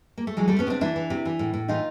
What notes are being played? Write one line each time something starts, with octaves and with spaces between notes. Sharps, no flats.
A#3
A3
E3 F#3 G#3
C3 G3 A3
B3 C#4
C3 C4 D4
E3 D4 E4
E3
C3
E3
A2
A2
E3 D#4 F4